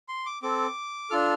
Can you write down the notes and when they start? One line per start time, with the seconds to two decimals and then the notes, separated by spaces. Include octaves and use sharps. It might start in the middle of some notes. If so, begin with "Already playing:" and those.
0.09 C6
0.26 D6
0.43 C4 A4 D6
1.10 D4 F4 A4 F6